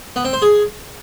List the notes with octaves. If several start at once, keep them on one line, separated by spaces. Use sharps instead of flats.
B3
C4
C5
G#4